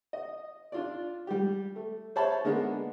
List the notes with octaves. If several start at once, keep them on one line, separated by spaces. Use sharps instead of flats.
D#5
D4 F4 D5
G3 G4
A3
C5 C#5 E5 A5 B5
D3 G#3 A#3 B3 D4